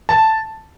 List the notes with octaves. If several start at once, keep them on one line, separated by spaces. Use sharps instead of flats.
A5